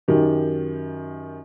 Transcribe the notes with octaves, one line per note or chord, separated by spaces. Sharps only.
F#2 D#3 G4